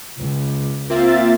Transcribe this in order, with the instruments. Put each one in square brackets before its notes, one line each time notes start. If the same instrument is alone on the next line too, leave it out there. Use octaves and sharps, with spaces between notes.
[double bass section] C#2
[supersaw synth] A#3 C4 [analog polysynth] F4 E5 A6